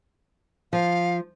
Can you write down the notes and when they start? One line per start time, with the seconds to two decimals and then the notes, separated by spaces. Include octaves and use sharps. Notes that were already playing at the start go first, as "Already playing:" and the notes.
0.73 F3 F5